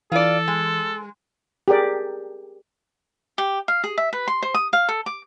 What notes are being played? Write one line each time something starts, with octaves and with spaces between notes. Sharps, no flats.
E3 F4 A4 D5
G#3
G4 G#4 A#4 D5
G4
F5
G#4
E5
B4
C6
C5
D#6
F5
A4
D6